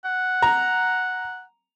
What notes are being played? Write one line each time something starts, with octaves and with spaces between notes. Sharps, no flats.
F#5
A#5